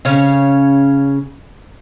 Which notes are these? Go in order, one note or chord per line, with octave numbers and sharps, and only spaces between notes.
C#3 C#4